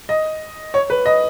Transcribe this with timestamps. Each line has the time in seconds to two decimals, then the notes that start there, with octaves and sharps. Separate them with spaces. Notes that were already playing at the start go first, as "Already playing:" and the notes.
0.09 D#5
0.74 C#5
0.90 B4
1.06 D#5